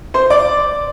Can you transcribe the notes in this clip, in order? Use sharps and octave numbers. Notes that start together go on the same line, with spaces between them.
C5 C6
D5 D6